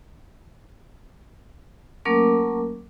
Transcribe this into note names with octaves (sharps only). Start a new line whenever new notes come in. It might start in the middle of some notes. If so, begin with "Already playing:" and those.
F#3 A3 A#3 C#4 A#4 D6